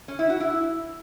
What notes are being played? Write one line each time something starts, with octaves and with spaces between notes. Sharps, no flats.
C#4
E4
F#4
E4